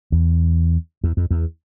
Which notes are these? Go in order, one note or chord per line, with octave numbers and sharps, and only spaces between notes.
E2
E2
F2
E2